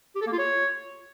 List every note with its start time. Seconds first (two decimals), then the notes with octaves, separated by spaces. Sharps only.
0.16 G4
0.21 A4
0.27 A#3
0.33 F4
0.38 C#5